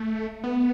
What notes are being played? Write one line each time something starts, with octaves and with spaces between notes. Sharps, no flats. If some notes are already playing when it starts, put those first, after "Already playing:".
Already playing: A3
B3